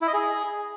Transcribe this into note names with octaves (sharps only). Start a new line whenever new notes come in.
E4
D#5
G#4